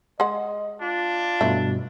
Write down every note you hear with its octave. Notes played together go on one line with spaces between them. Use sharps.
G#3 D#5 F#5
D4 F4
G2 B2 F#3 A3 E4